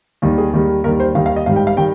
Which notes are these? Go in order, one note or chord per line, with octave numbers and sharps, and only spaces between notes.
D#2 D#3 G3
G#4
D#2 D#3 G3
D#2 D#3 G3 A#4
C5
D#2 D#3 G3 F5
F5
D#5
G#2 D#3 G3 F5
G5
F5
D#3 G3 G5